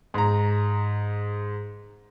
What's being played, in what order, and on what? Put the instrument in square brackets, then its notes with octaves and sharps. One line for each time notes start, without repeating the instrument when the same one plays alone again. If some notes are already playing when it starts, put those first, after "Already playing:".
[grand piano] G#2 A#5